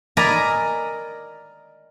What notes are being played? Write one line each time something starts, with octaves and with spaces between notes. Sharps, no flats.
A#4 D5 D#5 G#5 A#5 B5